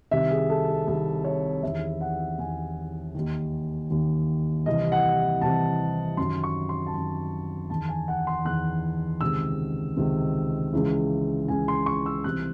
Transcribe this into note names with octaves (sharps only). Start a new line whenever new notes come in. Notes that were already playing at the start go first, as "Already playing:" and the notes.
C2 C3 D#3 E5
G#4
A4
G#4
C2 C3 D#3 A4
C#5
E2 D#3 E5
F#5
E2 D#3 G#5
D#2 D#3
D#2 D#3
C2 C3 E3 D#5
F#5
C2 C3 E3 A5
F#2 D#3 C6
C#6
C6
A5
F#2 D#3 C6
E2 D#3 A5
G#5
F#5
C6
E2 D#3 F#6
C#2 C3 D#3 E6
C#2 C3 D#3
C#2 C#3 E3
C#2 C#3 E3 G#5
C6
C#6
E6
C2 C3 E3 F#6